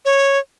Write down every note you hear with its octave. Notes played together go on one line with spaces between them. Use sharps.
C#5